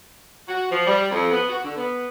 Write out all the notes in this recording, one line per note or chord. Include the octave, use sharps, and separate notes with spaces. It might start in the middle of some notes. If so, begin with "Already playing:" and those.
F#4
F3
G3
F2
B3
F#4
D3
B3